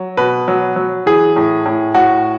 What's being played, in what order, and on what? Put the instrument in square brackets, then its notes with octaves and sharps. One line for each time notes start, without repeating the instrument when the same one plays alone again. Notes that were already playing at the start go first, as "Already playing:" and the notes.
Already playing: [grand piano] F#3
B2 B4
F#3
F#3
E3 G#4
A2
A2
A2 F#4